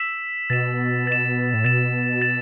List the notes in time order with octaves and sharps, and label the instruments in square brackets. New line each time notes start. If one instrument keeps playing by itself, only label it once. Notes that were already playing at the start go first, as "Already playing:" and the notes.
Already playing: [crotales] E6 B6 E7
[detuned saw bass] B2 [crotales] A6 E7
[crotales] A6 E7
[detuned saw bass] A2
[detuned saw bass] B2 [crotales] A6 E7
[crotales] A6 E7